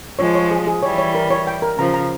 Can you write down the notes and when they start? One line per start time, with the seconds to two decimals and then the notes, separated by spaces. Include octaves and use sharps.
0.19 F3 G#3 C#5
0.35 C#5
0.51 G#4
0.67 G#4
0.83 E3 G3 C#5
0.98 C#5
1.15 A#4
1.30 C#5
1.47 G5
1.62 A#4
1.79 C#3 F3 A#5
1.94 A#5